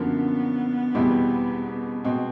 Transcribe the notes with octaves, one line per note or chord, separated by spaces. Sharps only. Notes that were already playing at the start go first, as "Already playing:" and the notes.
Already playing: F#2 D3 F3 A#3 B3
E2 B2 G3 C4 E4
B2 G#3 C4